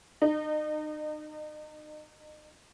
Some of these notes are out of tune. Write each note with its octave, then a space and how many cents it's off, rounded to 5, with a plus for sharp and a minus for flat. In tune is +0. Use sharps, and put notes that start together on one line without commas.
D#4 -35